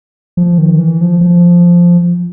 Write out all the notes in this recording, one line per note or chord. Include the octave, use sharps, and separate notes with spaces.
F3
D#3
E3
F3
F3